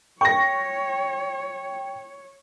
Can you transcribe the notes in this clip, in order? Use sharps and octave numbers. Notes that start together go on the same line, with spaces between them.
C#5 G5 C#6 A#6